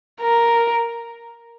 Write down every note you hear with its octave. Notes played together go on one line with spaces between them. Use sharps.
A#4